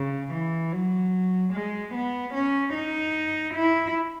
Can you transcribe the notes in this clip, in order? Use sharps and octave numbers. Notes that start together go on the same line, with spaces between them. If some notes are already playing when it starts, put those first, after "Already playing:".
Already playing: C#3
E3
F#3
G#3
B3
C#4
D#4
E4